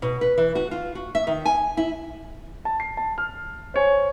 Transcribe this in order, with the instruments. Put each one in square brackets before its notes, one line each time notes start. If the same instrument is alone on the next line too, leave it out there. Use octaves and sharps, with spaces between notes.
[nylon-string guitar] B2
B4
E3
F#4
F4
F#4
E5
D#3
G#5
E4
[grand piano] A5
C7
A5
F6
C5 C#5 G#5